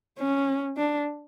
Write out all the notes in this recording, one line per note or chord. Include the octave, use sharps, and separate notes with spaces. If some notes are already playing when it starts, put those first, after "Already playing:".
C#4
D4